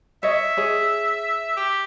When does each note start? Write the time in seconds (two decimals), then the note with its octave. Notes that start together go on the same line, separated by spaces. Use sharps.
0.23 C#5 D#5 E5
0.57 G#4 C#5
1.56 G4